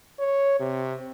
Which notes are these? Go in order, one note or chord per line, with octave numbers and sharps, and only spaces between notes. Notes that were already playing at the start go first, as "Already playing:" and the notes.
C#5
C3